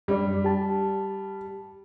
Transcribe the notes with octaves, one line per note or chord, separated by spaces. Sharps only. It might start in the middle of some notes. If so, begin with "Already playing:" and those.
F#2 G3 D4 D5
G4 A5